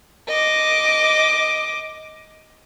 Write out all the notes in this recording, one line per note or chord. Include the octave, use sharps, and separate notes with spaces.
D#5 D6